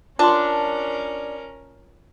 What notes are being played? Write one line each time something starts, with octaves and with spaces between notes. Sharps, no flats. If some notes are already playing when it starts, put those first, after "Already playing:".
C#4 D4 F4 A#4 F#5 C6